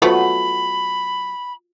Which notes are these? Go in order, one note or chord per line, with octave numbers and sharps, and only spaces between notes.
F#3 A3 B3 F4 F#4 C5 B5